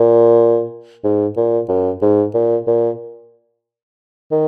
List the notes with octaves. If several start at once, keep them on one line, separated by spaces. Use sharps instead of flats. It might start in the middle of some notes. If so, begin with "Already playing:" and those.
Already playing: A#2
G#2
A#2
F#2
G#2
A#2
A#2
D#3